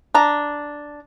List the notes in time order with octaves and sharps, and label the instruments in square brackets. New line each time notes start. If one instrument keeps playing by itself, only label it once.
[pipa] D4 A#5